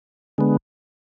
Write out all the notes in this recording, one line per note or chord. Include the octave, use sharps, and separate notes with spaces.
D3 G#3 B3